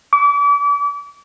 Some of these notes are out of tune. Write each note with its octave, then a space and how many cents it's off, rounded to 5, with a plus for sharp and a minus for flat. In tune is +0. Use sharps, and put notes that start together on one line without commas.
D6 -35